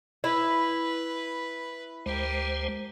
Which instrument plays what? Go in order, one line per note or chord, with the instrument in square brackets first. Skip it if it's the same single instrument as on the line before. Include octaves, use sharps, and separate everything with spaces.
[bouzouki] E4 [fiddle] B4
[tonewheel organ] D2 G#3 C5 [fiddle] G4 A#4